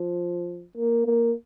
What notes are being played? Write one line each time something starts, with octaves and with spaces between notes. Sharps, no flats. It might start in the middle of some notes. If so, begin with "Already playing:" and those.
Already playing: F3
A#3
A#3